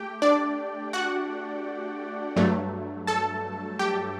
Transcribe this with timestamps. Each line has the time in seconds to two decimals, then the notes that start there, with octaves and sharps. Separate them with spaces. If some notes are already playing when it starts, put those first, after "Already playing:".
Already playing: A3 G4 G5
0.22 D4 D5
0.93 F#4 F#5
2.36 G2 F#3 A3
3.07 A4 A5
3.79 G4 G5